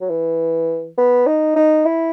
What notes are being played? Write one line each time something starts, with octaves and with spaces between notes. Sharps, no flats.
F#3
E3
B3
D#4
D#4
E4